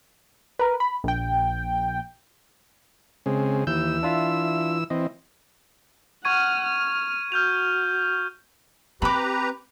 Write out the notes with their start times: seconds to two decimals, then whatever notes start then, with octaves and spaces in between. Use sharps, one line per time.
0.59 A#4 B4
0.80 B5
1.04 A#1 G5
3.26 C#3 G#3 C4
3.67 D#2 E3 E6 G6
4.03 D4 F4 E5
4.90 E3 C4 D#5
6.25 F#5 C#6 F6 G#6 D#7
6.64 F6
7.32 F#4 F6 G6 F7
9.02 C4 G4 B4 A#5 B5 D6